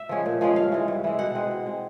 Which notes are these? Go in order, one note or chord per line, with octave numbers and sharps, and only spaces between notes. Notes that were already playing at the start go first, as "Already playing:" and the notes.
Already playing: E5
F3 G#3 C#4
A#2
F3 G#3 C#4
G2 F5
E3 G#3
G2
E3 G#3
B2 F#5
G#3 C4
B2
G#3 C4